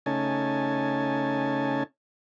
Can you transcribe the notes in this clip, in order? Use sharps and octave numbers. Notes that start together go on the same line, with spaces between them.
C#3 A3 C#4 D#4 G#5 A5